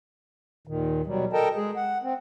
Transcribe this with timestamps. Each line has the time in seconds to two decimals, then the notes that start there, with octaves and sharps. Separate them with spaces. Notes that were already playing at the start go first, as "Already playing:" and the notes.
0.67 D#2 A#2 D#3
1.06 B2 F#3 G3
1.33 A4 A#4 D#5 G5 A5
1.56 G#3 G#4
1.76 F#5
2.03 C4